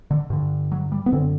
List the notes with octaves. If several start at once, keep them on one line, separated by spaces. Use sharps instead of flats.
D3
G2 D3
F#3
G3
B3
F#2 D3 C4